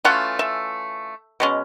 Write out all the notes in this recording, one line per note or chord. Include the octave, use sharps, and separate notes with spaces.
E3 A3 C#4 F4 F#5
E5
B2 G#3 C#4